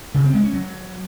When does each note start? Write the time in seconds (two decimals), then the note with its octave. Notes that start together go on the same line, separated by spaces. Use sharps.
0.14 C#3
0.24 C4
0.34 G#3
0.44 C#4
0.53 F#3